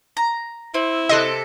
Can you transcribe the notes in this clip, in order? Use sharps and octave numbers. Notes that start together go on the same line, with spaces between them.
A#5
C4 E4
C3 A4 D#5 C6 F#6